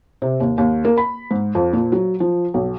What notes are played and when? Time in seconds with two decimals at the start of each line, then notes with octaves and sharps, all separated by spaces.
0.22 C3
0.40 D#2
0.58 D#2
0.85 A#3
0.97 B5
1.31 G#2
1.55 F2
1.73 A#2
1.92 F#3
2.20 F3
2.54 B1